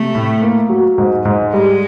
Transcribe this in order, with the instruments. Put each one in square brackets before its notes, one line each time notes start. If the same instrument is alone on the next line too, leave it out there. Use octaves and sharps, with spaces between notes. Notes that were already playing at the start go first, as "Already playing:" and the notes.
Already playing: [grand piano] C3 [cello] A3
[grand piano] A2
A#3
F#3
G#2
G#2
[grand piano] G3 [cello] G#3